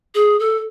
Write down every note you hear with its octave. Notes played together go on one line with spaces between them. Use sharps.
G#4
A4